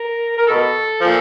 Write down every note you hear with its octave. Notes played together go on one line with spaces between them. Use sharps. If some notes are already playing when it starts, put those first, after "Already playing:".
Already playing: A#4
A#4
B2 A4
A#2 F3